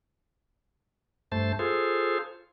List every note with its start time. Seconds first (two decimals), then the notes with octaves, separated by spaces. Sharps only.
1.32 G2 A3 C5 A5
1.59 F4 G#4 A4 C5